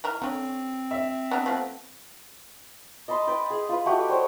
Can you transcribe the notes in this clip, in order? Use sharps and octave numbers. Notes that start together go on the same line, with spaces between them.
E3 A#4 A#5
D3 C4 C#4
E5
B3 D4 A#5
F3 A3 B3
D#5 A5 B5 C6
B4 G5 C6
G#4
F4 B4
A3 F#4 G4
G3 C5 C#5